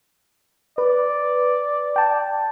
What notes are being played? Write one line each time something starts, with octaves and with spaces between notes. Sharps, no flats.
B4 D5
G5 A5